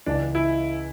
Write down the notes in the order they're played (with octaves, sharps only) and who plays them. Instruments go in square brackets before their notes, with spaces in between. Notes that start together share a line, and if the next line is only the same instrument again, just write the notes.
[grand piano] C#2 C#3 E3 [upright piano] D4
[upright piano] E4